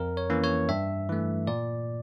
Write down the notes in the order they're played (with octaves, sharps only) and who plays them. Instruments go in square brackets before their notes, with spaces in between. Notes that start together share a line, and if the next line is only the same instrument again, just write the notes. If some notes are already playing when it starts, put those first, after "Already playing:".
Already playing: [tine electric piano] F2 A#4
C#5
E3 A#3 C#4
C#5
G2 E5
E3 A3
A#2 D5